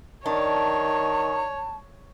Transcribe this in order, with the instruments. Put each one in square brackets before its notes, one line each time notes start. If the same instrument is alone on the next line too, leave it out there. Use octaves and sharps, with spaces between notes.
[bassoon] D#3 [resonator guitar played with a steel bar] D4 [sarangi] C#5 [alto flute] A5